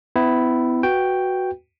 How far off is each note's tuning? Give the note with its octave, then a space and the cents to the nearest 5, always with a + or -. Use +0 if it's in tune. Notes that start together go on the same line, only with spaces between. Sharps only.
B3 +40 E4 +0
F#4 +0 B4 +0 G5 +0